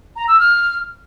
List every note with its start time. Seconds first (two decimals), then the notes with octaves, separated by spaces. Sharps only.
0.16 A#5
0.28 E6
0.40 F6